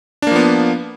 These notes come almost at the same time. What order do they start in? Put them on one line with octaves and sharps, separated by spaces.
D4 A#3 F3 B3